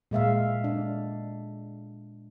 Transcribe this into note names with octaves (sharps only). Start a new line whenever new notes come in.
A#2 G#3 E5 F5
D4